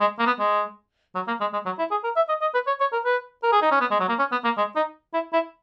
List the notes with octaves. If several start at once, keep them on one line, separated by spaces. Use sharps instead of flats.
G#3
A#3
B3
G#3
F#3
A#3
G#3
G#3
F#3
E4
G#4
A#4
E5
D#5
D#5
B4
C#5
C#5
A#4
B4
A#4
G#4
D#4
C#4
B3
G#3
F#3
A#3
C#4
B3
A#3
G#3
D#4
E4
E4